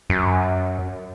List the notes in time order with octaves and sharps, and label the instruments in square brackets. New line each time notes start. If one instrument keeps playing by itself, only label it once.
[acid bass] F#2